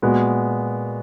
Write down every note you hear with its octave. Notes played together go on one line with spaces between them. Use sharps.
A#2 G#3 B3 F#4